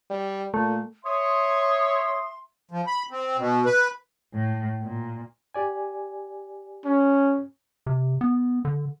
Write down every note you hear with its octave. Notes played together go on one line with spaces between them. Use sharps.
G3
A#2 A3
C#5 E5 C6 D#6
F3
B5
C4
B2
B4
A2
A#2
G4 D5 G#5
C#4
C3
B3
D3